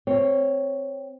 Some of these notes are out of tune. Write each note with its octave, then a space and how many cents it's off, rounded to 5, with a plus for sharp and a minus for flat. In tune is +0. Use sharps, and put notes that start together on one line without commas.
C4 +0 C#5 +0